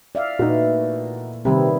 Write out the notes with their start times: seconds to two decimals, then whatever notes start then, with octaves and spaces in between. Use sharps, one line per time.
0.15 D5 E5 F5
0.39 A#2 D3 E3 A3 D#4 F#4
1.45 C3 D#3 G3 B3 C4 E4 B5